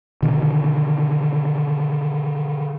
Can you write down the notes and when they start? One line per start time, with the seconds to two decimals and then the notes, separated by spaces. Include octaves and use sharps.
0.23 B2 D3 D#3